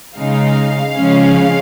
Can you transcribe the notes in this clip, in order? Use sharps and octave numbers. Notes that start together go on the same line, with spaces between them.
C#3 G#3 D#4 F5
C#3 F3 G#3 C#4